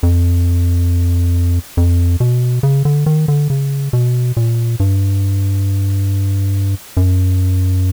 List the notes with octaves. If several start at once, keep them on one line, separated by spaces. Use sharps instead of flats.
F2
F2
B2
C#3
D3
D#3
D3
C#3
B2
A#2
G2
F#2